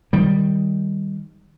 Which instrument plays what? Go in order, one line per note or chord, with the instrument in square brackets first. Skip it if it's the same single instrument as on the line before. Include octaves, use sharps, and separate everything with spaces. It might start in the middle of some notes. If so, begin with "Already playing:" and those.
[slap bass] D#3 G3